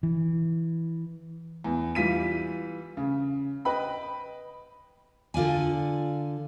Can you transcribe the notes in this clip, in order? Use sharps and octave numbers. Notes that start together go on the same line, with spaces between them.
E3
E2
E3 G3 F4 B6 D#7
C#3
B4 D#5 G5 B5
D3 F4 D5 G#5